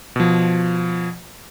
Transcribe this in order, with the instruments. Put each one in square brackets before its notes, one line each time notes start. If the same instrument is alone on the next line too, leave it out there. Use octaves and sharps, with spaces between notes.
[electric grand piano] B2 F3